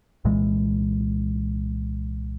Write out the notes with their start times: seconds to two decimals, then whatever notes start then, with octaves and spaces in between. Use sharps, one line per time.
0.25 C2 A#2 E3 G#3